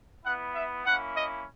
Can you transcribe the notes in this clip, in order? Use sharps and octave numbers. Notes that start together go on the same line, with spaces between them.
B3 E4 F#5
E5
A#3 C#4 E4 F#5
D#5